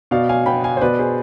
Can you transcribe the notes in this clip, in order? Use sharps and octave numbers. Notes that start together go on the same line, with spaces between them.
B2 D5 F5
F5 G#5
B3 G5 B5
F5 G#5
C5
B2 B4 D5
G#4 C5